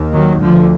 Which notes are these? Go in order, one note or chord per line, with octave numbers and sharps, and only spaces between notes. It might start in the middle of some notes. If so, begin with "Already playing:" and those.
Already playing: D#2
D#3 F#3
D2 D3 F3